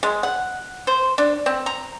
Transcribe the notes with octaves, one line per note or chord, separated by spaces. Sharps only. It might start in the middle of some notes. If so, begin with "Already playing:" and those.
G#3
F#5
C5
D4
C4
A#5